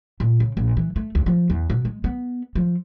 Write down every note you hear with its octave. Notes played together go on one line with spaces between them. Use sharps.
A#2
C#3
A#1
E3
A3
D2
F3
E2
B2
G#3
B3
F3